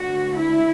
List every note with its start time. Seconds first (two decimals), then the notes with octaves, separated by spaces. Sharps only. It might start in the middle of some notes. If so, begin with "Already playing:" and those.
Already playing: D2 D3 F#4
0.36 E4